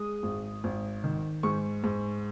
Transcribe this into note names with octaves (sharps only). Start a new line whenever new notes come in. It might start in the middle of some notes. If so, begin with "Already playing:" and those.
Already playing: G#3 D#6
G#1
G#1
D#3
G#2 C#6
G#2